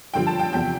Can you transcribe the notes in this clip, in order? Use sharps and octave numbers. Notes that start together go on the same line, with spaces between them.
G2 D3 F3 G5
A5
G5
E2 C3 F3 G5